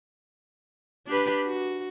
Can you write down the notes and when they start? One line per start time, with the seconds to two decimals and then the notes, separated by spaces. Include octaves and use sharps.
1.07 D4 G4 B4
1.46 F#4